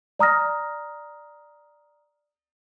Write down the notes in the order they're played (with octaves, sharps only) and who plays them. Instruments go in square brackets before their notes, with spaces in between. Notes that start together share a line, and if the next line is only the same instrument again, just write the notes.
[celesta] D5 A#5 D#6 F6 A#6